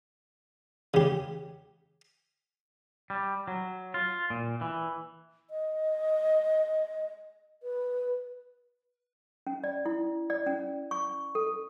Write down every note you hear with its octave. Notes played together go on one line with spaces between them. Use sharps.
C#3 G4
G3
F#3
F4
A#2
E3
D#5
B4
C#4
D5
E4
D5
C#4
C#6
A4